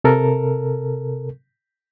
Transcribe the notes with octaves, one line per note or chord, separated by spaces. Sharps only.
C3 A4 A#4